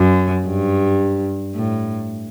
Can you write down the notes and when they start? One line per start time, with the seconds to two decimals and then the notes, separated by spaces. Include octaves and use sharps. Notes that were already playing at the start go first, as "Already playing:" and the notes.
Already playing: F#2
0.46 G2
1.55 A2